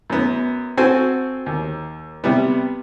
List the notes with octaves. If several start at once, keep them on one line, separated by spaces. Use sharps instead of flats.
F#2 B3
C4 F#4 A4 C5 G#5
D#2
C3 G3 B3